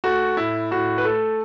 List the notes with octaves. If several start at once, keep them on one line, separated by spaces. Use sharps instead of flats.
A3 F#4
A2 E4
A2 F#4
B4
A3 A4